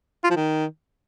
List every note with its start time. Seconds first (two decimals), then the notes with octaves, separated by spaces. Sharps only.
0.24 F4
0.30 F3
0.36 D#3